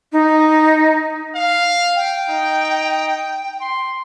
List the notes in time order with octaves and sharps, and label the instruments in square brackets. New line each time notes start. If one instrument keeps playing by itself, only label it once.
[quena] D#4
[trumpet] F5
[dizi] G5
[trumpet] D#4
C6